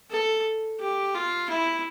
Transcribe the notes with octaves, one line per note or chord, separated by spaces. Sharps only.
A4
G4
F4
E4